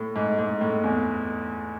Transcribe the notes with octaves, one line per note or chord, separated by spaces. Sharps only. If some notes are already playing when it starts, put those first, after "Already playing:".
Already playing: A2
G#2
G#2
A2
E2